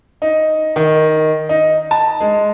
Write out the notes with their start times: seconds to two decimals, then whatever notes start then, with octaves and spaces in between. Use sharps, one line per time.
0.22 D#4
0.76 D#3
1.49 D#4
1.91 A5
2.20 G#3